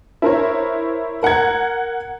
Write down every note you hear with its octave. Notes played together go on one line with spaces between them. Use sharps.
E4 A#4 C5 C#5
A#4 F#5 A#5 G#6